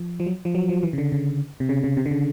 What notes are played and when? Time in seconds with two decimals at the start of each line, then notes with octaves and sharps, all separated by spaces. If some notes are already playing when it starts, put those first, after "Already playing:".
Already playing: F3
0.20 F3
0.26 F#3
0.45 F3
0.55 F#3
0.69 F3
0.83 E3
0.93 C#3
0.98 D3
1.12 C#3
1.60 C3
1.69 C#3
1.84 C#3
1.97 C3
2.06 D3
2.11 C#3